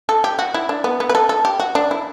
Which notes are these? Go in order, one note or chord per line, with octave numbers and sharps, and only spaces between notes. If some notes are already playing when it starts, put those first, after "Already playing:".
A4
G4
F#4
E4
D4
B3
B3
B4
A4
A4
G4
F#4
D4
E4